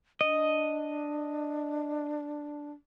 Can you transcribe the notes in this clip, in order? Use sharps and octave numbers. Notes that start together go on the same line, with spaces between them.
D4 D#5